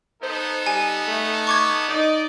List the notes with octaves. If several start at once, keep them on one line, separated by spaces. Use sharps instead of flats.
B3 D#4 A4 C5
G3 G#5
A3
C#6 D6 G#6
D#4 D5 D#5